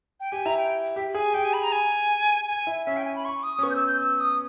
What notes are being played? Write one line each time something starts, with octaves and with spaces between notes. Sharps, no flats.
G5
G4 G#5
E4 A#5
G5
G4 E5
G#4 G#5
G4 G5
G#5
B5
A#5
G#5
G#5
E4
C#4 E5
G5
G#5
B5
C#6
D#6
C#4
B3 C#6
G6
E6
G6
E6
D#6